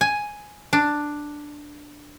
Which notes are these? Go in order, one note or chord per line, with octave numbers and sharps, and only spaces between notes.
G#5
D4